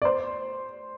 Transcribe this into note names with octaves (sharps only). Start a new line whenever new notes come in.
D5
C5